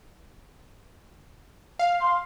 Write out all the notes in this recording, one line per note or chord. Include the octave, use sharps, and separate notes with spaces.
F5
C6